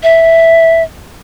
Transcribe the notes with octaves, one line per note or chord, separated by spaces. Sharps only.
E5